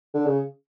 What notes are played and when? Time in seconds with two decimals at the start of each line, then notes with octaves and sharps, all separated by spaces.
0.14 D3
0.26 C#3